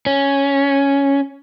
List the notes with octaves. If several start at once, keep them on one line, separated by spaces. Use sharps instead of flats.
C#4